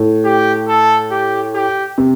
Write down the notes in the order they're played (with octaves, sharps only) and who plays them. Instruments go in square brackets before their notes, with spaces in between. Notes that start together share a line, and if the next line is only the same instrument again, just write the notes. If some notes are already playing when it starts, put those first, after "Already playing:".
Already playing: [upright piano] A2
[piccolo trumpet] G4
A4
G4
G4
[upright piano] C3